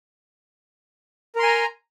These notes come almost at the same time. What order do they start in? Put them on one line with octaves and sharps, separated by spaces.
A#4 C6 G#5 A#5